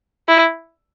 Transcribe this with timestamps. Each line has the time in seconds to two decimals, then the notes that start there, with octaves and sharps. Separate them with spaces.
0.28 E4